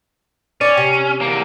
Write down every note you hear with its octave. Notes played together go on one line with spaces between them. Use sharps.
C#4 D5
C3
E2 A#3